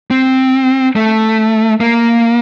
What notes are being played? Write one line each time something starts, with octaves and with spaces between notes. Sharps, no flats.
C4
A3
A#3